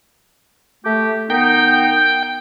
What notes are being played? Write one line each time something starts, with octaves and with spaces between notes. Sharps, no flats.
A3 G4
D#3 B3 D#4 G5